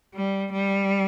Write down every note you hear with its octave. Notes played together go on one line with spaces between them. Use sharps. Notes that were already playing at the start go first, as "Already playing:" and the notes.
G3
G3